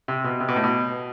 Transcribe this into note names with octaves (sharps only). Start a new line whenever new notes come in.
C3
B2
C3
B2
A2
B2